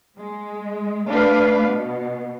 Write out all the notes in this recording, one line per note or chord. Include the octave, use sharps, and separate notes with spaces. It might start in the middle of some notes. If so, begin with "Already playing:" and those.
G#3
A3 D4 B4 F5
B2